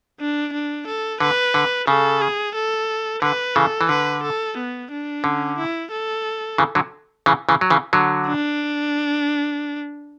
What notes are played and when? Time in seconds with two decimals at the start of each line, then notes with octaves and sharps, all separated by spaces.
0.20 D4
0.53 D4
0.87 A4
1.20 D3 B4
1.54 D3
1.87 C#3 A4
2.22 G#4
2.55 A4
3.22 D3 B4
3.55 C#3 E3 A4
3.81 E3
3.89 D3 B4
4.23 A4
4.57 B3
4.91 D4
5.24 D3 C#4
5.58 E4
5.91 A4
6.58 C#3 E3
6.75 D3 F#3
7.26 C#3 E3
7.49 C#3 E3
7.61 F#3
7.70 C#3 E3
7.93 D3 F#3
8.27 D4